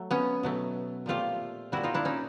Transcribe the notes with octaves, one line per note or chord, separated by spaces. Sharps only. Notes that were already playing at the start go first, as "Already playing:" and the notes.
Already playing: F#3 A3
B3 C#4
B2 F#3 A3
A#2 F3 A3 F4 G4
A#2 G3 E4 F#4
D#4 F4
D4 E4
C#4 D#4